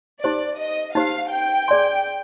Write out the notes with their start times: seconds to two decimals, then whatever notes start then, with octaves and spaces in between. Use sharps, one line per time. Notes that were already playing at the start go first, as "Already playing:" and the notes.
0.24 D#4 G4 C5 D5
0.59 D#5
0.95 D#4 G4 C5 F5
1.32 G5
1.68 G#4 D5 G#5 C6